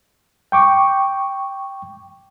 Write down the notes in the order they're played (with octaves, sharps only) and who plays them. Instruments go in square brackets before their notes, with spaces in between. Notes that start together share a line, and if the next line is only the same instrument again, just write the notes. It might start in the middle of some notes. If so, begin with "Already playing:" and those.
[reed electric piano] G5 C#6 D6